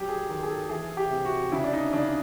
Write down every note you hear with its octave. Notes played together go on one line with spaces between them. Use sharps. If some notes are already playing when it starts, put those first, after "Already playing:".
Already playing: F#3 G4
G#4
D#3
G#4
A4
E3 G#4
G4
C3
F#4
C#3 E4
D4
D#4
C#3 D4